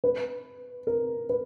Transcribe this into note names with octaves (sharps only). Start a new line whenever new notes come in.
B4
A#4
B4